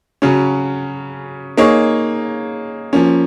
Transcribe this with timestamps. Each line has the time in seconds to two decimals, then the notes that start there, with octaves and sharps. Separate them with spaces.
0.22 C#3 F#3 C#4
1.57 A#3 D#4 G#4 C#5
2.93 F3 A#3 C#4